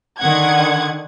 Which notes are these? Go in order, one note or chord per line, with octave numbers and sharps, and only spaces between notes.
D3 D#3 F#5 G#6